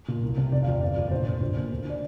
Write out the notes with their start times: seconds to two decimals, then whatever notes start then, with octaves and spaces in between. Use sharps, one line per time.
0.08 A#2
0.23 C2
0.37 C3
0.52 F1 D5
0.63 F5
0.68 F2 D5
0.81 G1 D5
0.96 F2
1.07 D5
1.11 A#1 C5
1.26 A#2
1.41 A#1 C5
1.56 A#2
1.71 D2
1.85 D3 D5